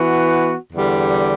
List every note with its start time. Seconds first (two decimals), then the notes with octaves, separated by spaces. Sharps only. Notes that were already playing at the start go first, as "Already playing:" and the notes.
Already playing: E3 B3 F#4
0.72 E2 D3 G3